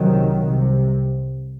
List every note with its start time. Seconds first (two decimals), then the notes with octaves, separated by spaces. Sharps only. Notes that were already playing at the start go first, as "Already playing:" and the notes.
Already playing: C2 C3 D#3 F#3
0.39 C2 C3